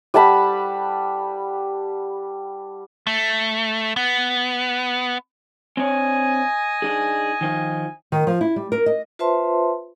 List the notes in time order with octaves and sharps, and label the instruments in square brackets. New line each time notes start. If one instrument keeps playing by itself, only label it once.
[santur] G3 F#5 A5 B5
[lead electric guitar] A3
B3
[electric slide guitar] C4 D4 C#5 [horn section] D#5 G#5
[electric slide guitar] D4 D#4 G#4
D#3 F3 D#4
[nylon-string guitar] D#3
F3
E4
G3
A#4
D#5
[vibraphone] F4 B4 C5 E5 A5 C6